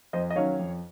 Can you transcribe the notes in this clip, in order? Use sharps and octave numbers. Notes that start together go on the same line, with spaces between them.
F2 C5 D#5
D#5
D#3 F#3 C#4 C#5 F5
F2